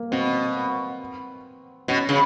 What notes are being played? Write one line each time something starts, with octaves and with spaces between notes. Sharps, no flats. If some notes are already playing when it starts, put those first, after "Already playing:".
Already playing: A#3
B2 C4
B2 C#4
C#3